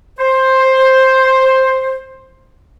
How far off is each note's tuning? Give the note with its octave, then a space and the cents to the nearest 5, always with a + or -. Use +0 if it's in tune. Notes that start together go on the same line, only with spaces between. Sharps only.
C5 +10